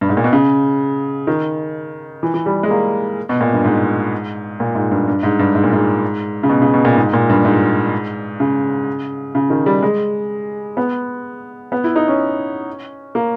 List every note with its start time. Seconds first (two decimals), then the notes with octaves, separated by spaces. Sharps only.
0.01 G2
0.09 G#2
0.17 A#2
0.24 B2
0.33 C#3
1.27 D#3
2.23 E3
2.34 E3
2.46 G3
2.63 G#3
2.70 A#3
3.29 B2
3.41 A#2
3.53 G2
3.64 G#2
4.60 A#2
4.75 G#2
4.91 G2
5.07 G2
5.23 G#2
5.39 G2
5.55 G#2
5.64 A#2
5.73 G#2
6.43 C#3
6.49 B2
6.62 C#3
6.74 B2
6.85 A#2
6.97 G#2
7.13 A#2
7.29 G2
7.45 G#2
8.40 C#3
9.35 C#3
9.50 D#3
9.66 G3
9.82 G#3
10.77 B3
11.72 B3
11.84 E4
11.96 D#4
12.08 C#4
13.15 A#3